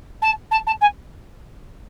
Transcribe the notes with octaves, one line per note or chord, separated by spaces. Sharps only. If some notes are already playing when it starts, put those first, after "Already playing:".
A5
A5
A5
G#5